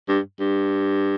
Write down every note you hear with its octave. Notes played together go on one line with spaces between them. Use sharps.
G2
G2